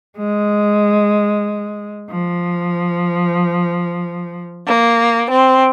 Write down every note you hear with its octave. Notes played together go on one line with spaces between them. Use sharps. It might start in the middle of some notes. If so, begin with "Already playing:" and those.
G#3
F3
A#3
C4